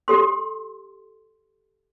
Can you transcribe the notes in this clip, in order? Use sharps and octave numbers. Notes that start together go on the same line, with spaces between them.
G4 A4 C6